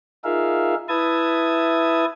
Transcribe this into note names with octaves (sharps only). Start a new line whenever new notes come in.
D#4 F4 G#4 A#4 E5 F5
E4 B4 E5 A5 D#6 G#6